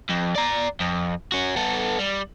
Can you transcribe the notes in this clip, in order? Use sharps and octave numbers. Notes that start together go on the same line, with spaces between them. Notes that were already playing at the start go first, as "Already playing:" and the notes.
F2
D5 A#5
F2
C#4 F#4
B3 A4
G3